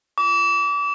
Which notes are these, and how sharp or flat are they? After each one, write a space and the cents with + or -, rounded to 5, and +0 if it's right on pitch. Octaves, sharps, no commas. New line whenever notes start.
D6 -35